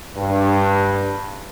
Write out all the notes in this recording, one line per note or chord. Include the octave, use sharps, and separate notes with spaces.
G2